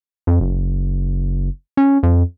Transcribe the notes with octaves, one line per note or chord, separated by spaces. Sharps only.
F2
F#1
C#4
F2